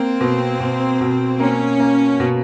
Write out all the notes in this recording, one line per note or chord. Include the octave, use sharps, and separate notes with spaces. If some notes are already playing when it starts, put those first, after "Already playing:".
Already playing: A#3 C4
B2
B2
B2
A#3 C#4
A#3
B2